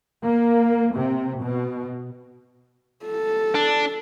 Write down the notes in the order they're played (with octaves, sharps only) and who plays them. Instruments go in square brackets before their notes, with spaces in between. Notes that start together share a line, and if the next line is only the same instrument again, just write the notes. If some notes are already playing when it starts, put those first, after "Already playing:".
[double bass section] A#3
C3
B2
[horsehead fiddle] A4
[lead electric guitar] D4